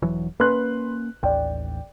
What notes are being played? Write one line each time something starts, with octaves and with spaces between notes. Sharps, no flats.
E1 E3 F#3
A#3 C#4 B4 C6 F#6
A1 D#2 D5 G5